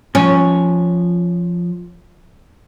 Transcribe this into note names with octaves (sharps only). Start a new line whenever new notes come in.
F3 C#4 C#5